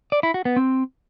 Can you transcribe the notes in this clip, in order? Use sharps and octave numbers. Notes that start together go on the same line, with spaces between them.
D5
E4
F#4
B3
C4